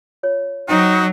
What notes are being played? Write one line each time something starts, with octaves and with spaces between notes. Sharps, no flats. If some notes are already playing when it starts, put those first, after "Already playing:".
F4 C#5
F#3 D#4 F#4 C5 G5